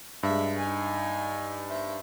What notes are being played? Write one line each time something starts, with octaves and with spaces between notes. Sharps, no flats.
G2 G#3 E5
D#4 G#5
C5 E5